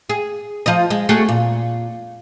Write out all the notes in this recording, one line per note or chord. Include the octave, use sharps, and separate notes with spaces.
G#4
F3 D#5
G#3
A3 F#4 G#4
A#2